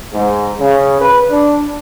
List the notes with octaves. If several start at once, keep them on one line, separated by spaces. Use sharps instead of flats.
G#2
C#3
B4
D4